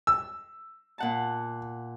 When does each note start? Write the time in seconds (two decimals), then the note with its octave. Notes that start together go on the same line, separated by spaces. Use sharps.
0.07 E6
0.98 A#2 F#5 A5